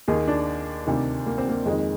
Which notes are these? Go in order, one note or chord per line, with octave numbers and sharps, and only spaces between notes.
D#2 D#3 G#4
D4
D2 C3 D#3
A#3
C4
A#3
F2 D#3 G#3